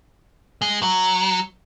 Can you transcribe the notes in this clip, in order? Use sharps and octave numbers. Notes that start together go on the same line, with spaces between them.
G#3
F#3